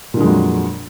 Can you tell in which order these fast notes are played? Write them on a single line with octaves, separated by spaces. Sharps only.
A#2 D3 G#3 F2 F#3